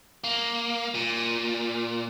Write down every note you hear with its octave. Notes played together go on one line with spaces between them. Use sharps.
A#3
A#2